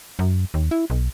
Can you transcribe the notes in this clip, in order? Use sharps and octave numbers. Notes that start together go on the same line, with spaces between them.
F#2
D#2
E4
B1